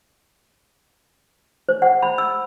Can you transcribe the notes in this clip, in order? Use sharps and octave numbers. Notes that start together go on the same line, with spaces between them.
C5
F#5
B5
E6